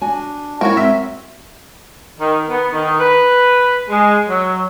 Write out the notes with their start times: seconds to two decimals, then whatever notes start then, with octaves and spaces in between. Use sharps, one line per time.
0.02 D4 F#4 G#5
0.61 G#3 A#3 C#4 E4 F#4 A#4
0.77 G#3 C4 E5
2.19 D#3
2.49 B3
2.72 D#3
2.99 B4
3.89 G#3
4.28 F#3